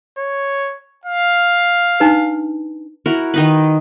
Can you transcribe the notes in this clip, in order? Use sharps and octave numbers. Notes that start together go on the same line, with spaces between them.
C#5
F5
D4 D#4 B4
E4 F#4 A#4
D#3 D#4 B4